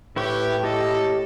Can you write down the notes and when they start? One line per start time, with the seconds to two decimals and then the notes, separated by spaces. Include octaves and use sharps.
0.16 A2 E4 G4 B4 C#6
0.64 G4 A4 D#5